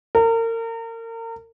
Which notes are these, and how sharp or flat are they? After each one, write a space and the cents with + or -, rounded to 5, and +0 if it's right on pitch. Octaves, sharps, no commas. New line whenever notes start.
A#4 -35